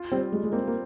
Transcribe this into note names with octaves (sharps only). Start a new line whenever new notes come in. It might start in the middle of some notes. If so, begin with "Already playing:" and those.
Already playing: F4
G3 C4
G3 G#3
G#3
A#3 C4
A#3